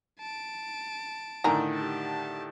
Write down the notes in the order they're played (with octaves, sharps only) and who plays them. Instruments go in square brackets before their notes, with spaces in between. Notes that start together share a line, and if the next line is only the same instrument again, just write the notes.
[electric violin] A5 D7
[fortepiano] A2 D3 D#3 [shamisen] A#4 G#5 A#5
[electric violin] G4 A5